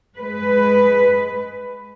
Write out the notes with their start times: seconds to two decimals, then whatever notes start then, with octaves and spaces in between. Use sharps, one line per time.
0.16 G#3 B4